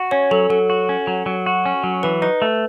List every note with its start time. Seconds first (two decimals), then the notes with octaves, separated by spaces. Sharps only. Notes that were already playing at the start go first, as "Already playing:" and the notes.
Already playing: F#4
0.11 C#4 C#5
0.31 F#3 A4
0.50 F#3 A4
0.70 F#4
0.89 C#4
1.07 F#3
1.26 F#3
1.46 F#4
1.66 C#4
1.84 F#3
2.03 E3 B4
2.22 D#4 B4
2.42 A3